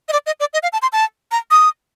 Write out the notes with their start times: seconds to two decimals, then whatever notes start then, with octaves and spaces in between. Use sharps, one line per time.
0.09 D#5
0.13 D5
0.26 D#5
0.40 D5
0.53 D#5
0.63 F5
0.73 A5
0.82 C6
0.93 A5
1.32 A#5
1.51 D#6